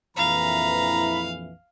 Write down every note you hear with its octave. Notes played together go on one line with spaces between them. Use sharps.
A#1 F2 E3 F5 A#5 B5